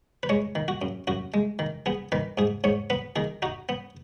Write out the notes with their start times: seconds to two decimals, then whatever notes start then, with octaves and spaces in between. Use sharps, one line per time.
0.23 B4
0.29 G#3 C#5
0.55 D#3
0.68 F#4
0.82 F#2
1.07 F#2 F#4
1.34 G#3
1.59 D#3
1.86 B3 G#4
2.12 D#3 B4
2.38 G#2 G#4
2.64 G#2 C#5
2.90 B3 B4
3.16 D#3 G#4
3.42 D#4 F#4
3.69 B3